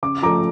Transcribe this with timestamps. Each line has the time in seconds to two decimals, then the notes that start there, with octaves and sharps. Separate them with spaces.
0.03 C#3 D6
0.22 F3 A3 A#5 D6